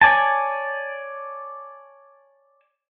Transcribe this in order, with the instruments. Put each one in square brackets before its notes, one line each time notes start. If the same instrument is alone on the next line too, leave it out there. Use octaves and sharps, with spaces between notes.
[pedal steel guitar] C#5 D5 G#5 A5